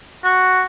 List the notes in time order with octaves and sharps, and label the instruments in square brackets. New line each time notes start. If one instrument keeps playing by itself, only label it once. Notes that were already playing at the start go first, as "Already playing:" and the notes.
[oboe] F#4